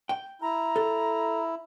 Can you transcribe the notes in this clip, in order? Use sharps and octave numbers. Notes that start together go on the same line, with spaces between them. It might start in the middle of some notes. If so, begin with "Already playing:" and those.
G5
E4 A#5
A4